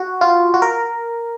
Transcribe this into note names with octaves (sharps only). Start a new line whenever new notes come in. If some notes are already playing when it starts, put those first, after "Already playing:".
Already playing: F#4
F4
F#4
A#4